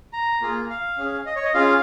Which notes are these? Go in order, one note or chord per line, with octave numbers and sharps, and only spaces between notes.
A#5
A#3 F4 G#4
F5
C#4 G#4
D#5
C#5
D#5
C#4 F4 G#4 F5